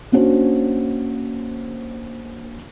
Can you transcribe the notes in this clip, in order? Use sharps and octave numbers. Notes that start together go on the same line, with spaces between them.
A#3 C#4 D4 F#4 C5